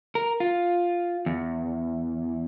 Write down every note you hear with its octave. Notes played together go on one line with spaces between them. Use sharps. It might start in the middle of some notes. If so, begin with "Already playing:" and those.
A#4
F4
E2